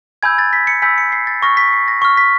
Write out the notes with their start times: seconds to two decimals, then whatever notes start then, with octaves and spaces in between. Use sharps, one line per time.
0.23 G#5 B5 E6 G6 G#6
0.39 A6
0.53 B6
0.67 C#7
0.82 G#5 B5 E6 G6 B6
0.98 C#7
1.12 C7
1.27 A6
1.42 C#6 F6 A#6
1.57 B6
1.73 C7
1.88 A#6
2.02 C#6 F6
2.17 B6